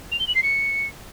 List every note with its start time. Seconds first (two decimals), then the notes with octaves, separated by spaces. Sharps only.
0.11 F7
0.19 G7
0.27 F#7
0.35 C7
0.43 C#7